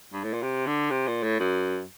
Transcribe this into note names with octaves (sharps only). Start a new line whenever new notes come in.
G2
A2
A#2
C3
D3
C3
A#2
A2
F#2